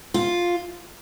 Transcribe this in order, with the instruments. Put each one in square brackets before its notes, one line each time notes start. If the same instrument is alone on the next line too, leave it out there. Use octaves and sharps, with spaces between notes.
[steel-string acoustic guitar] F4